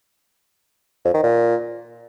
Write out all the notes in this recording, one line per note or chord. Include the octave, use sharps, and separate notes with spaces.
F2
D#3
A#2